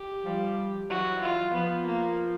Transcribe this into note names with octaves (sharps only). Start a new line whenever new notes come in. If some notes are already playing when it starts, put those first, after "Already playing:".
Already playing: G4
F3 G3
E3 F#3 F#4
F4
F3 B3
A#3